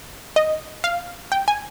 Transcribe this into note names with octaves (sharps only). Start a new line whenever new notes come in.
D#5
F5
G5
G#5